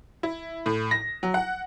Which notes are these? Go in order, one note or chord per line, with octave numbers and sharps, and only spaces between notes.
E4
A2
A#6
F#3
F#5